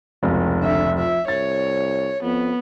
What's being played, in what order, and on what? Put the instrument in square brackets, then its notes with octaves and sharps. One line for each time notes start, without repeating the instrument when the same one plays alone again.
[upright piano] F1 C#2 [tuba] B2
[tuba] D3 [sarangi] E5
[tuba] F3 [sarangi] E5
[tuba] C2 [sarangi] C#5 [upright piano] A6
[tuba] F2 [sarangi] B3